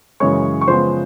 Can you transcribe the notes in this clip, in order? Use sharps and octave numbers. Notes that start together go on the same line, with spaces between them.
F#2 C#3 E3 G#3 C#5 C#6
C#6
C#3 F3 G#3 B3 C5 C6